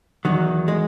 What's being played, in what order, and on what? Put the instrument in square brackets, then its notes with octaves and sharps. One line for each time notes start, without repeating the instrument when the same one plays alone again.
[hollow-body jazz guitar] E2 D#3 F#3
G#3